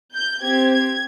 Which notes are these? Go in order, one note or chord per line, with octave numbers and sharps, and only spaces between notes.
G6
C4 G4 G#6
G#6